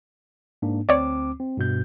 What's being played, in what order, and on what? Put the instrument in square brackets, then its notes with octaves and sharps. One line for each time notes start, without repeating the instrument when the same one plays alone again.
[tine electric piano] G#2 A#3 D4
[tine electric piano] D2 C4 D6 [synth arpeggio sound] C#5 D5
[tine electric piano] C4
G2 B2 G6